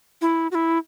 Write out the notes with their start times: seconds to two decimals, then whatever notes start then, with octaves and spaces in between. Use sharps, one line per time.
0.22 E4
0.51 F#4
0.55 E4